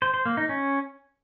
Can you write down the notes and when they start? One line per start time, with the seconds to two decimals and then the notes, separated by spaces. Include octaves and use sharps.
0.02 C5
0.14 C5
0.26 A#3
0.37 D#4
0.49 C#4